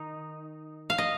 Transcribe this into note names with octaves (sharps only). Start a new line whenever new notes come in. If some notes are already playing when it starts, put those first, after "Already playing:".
Already playing: D#3 D#4
F5
D#5